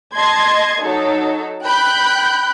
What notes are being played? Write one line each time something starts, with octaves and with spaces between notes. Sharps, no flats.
D#5 A5 C6 G#6
F#3 D#4 A4
G5 B5 F#6 G6